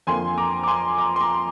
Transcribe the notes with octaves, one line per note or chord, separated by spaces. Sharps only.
F2 D3 F3 A#3 G#5 C6
A#5 D6
D6
G#5 C6
A#5 D6
C6
A#5 D6